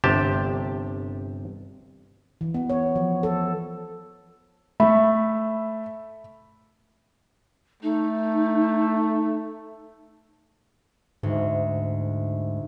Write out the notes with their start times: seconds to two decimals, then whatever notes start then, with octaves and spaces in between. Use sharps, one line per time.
0.04 G1 C3 G4 A5
2.41 E3
2.54 B3
2.70 C#5
2.96 F3
3.23 A4
4.80 A3 E5 B5
7.83 A3 D#4
11.23 D2 G#2